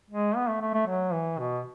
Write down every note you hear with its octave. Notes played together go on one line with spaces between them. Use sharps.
G#3
B3
A3
A3
A3
F#3
E3
B2